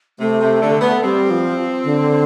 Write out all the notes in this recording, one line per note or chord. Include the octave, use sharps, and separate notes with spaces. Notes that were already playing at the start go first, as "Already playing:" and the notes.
C3 A3
C3
D3
B3
G3 C4
F3
D3